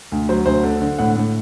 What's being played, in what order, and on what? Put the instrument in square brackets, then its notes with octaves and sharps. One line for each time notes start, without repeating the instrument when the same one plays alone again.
[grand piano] D2
F#3 C5
D2 C5
D3
D3
A2 F#5
A2